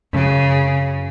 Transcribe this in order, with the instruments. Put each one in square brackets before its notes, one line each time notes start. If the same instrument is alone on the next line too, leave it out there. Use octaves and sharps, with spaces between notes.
[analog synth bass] F#2 [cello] C#3